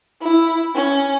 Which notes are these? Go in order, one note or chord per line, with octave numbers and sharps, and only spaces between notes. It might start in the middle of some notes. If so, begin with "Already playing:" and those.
E4
C#4